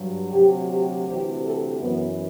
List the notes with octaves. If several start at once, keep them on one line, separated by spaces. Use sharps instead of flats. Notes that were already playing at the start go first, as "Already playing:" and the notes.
Already playing: G2 F#3
D2 C3 F#3 G4
G4
D2 C3 E3 G4
A4
F#2 E3 B3